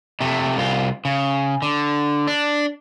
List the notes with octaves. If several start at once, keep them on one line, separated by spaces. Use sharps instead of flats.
C3 A3
C2 F4
C#3
D3
D4